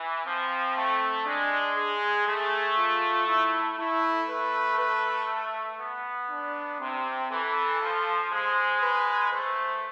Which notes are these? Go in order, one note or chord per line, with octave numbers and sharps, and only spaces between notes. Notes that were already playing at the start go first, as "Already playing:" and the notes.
Already playing: E3
F3 C4
A3
G#3 D4
G#4
A3 G#4
F4
E4
A3 E4
B4
B4
B3
D4
C3 C4
E3 A4
F3
G#3 C5
B4
A3 C5